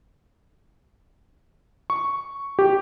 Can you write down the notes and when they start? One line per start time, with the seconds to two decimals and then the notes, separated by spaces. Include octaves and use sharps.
1.90 C#6
2.59 G4